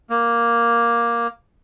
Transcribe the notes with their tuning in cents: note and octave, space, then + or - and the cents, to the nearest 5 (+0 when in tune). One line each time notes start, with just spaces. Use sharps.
A#3 +5